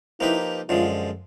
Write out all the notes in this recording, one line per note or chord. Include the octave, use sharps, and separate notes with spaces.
F3 A#3 D#4 E4 G4 B4
F#2 D3 F3 G#3 F4